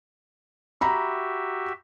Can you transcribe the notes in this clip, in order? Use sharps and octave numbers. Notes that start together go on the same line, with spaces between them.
F#4 G4 E5 A#5 B5